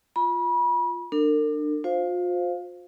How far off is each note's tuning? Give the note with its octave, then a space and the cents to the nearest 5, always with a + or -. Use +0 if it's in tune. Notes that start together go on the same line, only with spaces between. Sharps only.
F4 +5 B5 -35
D4 +30 A#4 -40
F4 +40 C5 +0 F5 +0